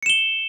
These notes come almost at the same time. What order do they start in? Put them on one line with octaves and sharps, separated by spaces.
C#7 E7 G7